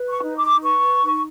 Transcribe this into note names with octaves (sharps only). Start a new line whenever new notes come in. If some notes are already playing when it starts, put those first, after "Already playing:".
Already playing: B4
C#6
D#4
D6
B4 C#6
D#4